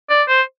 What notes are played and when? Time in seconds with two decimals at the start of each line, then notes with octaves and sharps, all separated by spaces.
0.10 D5
0.28 C5